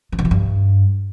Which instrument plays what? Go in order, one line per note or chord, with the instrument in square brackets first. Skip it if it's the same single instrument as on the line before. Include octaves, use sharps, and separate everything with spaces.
[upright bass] E3
D3
F3
G2